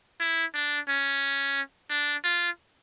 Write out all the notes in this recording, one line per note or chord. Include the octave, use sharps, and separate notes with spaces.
E4
D4
C#4
D4
F4